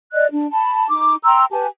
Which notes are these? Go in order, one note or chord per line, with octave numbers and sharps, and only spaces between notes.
D5 D#5 F#6
D4
A5 B5
D#4 D6
G5 A#5 C6 E6
G4 B4 G#5 A5